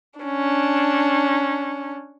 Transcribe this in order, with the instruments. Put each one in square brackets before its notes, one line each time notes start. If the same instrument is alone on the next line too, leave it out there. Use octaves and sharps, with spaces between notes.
[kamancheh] C#4 D4